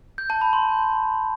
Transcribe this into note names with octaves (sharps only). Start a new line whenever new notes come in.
G6
A5
B5
C6